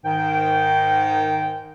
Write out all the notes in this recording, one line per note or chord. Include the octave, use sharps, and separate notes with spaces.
G#2 D#3 G5